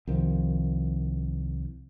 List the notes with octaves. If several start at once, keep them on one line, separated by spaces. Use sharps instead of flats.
C2 D#3 F3